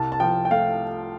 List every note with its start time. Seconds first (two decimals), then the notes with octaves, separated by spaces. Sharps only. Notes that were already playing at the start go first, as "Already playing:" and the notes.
Already playing: C2 A5
0.12 A5
0.20 F3 G5
0.45 G5
0.51 A3 F5